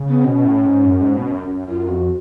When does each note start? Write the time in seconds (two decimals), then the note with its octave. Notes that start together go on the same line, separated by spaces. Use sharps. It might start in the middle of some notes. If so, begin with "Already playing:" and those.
Already playing: C#3
0.09 B3
0.24 B2 C#4
0.45 A2
0.66 G#2
0.86 F#2
1.01 G#2
1.17 B2
1.32 F#2
1.47 F#2
1.68 F#2 F4
1.88 F2 F#4